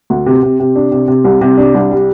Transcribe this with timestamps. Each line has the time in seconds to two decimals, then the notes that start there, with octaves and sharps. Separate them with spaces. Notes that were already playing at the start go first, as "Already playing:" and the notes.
0.10 D2
0.26 C3
0.43 C3
0.60 C3
0.76 D4
0.92 C3
1.08 C3
1.25 C2
1.41 C3
1.58 D4
1.75 C2
1.91 G3